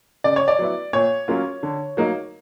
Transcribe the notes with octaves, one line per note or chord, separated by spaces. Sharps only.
C#3 D5
C#5
D5
F#3 B3 E4
A#2 C#5
F#3 A#3 C#4 F4
D3
F#3 A#3 D#4